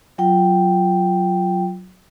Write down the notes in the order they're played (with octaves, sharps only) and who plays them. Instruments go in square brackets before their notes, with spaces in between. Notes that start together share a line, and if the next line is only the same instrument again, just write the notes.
[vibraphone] F#3 F4 G5